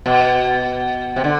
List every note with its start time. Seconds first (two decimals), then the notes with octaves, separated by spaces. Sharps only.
0.06 B2
1.16 C3
1.24 D3